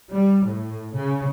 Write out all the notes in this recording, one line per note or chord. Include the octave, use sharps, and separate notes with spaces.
G3
A2
C#3